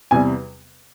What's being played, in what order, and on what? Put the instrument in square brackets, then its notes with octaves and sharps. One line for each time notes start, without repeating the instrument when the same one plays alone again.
[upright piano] E2 C3 G3 G#5